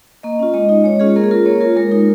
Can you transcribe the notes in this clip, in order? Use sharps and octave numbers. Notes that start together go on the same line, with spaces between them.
A#3 D#5
C#4 F4
G#3 D#5
D#4 D#5
G#3 C#5
C#4 F4 G#4
A#3 A#4
G#4
F4 A#4
A#3 C#5
F4 A#4
G#3 A#4
D#4 A#4